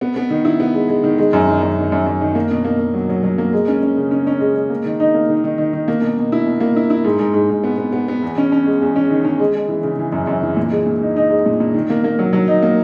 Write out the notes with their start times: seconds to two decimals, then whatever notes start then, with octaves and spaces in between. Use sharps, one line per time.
0.01 B3
0.16 B3
0.30 D#3
0.45 E4
0.60 B3
0.74 G#3
0.88 G#3
1.04 D#3
1.18 G#3
1.33 F#2
1.48 D#3
1.63 F#2
1.78 D#3
1.92 F#2
2.06 F#2
2.21 D#3
2.35 A#3
2.51 B2
2.64 A#3
2.79 B2
2.94 F#3
3.09 F#3
3.23 F#3
3.38 A#3
3.53 G#3
3.68 C#4
3.83 C#4
3.97 C#3
4.11 C#4
4.27 C#4
4.40 G#3
4.56 G#3
4.70 A#3
4.85 D#3
5.00 D#4
5.14 A#3
5.30 D#3
5.44 D#3
5.58 D#3
5.73 D#3
5.88 A#3
6.02 B2
6.17 B2
6.32 E4
6.47 B2
6.60 A#3
6.76 E4
6.90 E4
7.04 G#2
7.19 G#2
7.34 G#2
7.50 G#2
7.64 B3
7.78 B3
7.92 B3
8.08 B3
8.23 E2
8.38 C#4
8.52 C#4
8.66 G#3
8.82 E2
8.96 C#4
9.10 D#3
9.24 C#4
9.39 G#3
9.55 G#3
9.69 E3
9.83 C#3
9.99 E3
10.13 F#2
10.27 F#2
10.43 E3
10.57 A#2
10.71 G#3
10.86 A#2
11.02 D#4
11.16 D#4
11.30 G#3
11.46 A#2
11.60 A#2
11.74 D#3
11.90 A#3
12.04 A#3
12.19 F#3
12.33 F#3
12.48 D#4
12.62 A#3